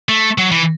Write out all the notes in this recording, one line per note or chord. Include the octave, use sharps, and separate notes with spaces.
A3
F#3
E3